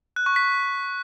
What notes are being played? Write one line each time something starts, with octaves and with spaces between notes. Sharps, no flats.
F#6
C#6
B6